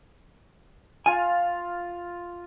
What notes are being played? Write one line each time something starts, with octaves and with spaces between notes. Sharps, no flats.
F4 F5 G#5